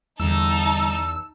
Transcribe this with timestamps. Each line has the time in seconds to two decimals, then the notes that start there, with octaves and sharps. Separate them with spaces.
0.20 E2 D3 G3 D#4 A5 E6